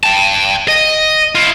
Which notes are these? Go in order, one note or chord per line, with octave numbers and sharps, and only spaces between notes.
G5 A5
D#5
E4 F4